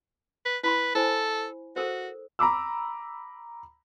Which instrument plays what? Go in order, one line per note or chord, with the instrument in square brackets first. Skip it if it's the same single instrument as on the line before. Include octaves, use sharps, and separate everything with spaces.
[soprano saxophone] B4
[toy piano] E4 B5 C6 [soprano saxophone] B4
[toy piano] E4 C5 G#5 [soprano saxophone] A4
[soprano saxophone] F#4 [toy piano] A4 A#4 C5
[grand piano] A#5 B5 D6 E6